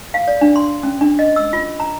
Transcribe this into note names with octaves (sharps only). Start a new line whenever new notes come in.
F5
D5
D4
C6
C#4
D4
D#5
E6
F4
A#5